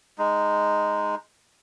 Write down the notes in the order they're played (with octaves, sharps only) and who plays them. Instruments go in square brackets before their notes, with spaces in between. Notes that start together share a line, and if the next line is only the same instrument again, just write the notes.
[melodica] G#3 D#4